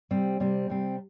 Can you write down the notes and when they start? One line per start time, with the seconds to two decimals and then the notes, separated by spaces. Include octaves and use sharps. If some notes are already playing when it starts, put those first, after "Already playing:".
0.11 C3 G3 C4
0.40 C3 G3 C4
0.69 C3 G3 C4